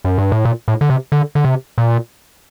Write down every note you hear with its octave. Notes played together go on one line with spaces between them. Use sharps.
F#2
G2
A2
A#2
A2
D3
C3
D3
D3
C3
A#2